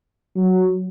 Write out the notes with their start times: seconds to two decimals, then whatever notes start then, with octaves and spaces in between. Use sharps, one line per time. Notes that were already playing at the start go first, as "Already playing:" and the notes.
0.36 F#3